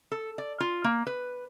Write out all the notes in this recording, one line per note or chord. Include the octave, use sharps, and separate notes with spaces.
A4
D5
F4
A#3
B4